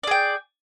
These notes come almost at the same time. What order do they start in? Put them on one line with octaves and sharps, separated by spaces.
D5 G#4 G5